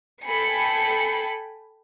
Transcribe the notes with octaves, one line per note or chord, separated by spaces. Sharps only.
A4 G5 G#5 B5 C7 C#7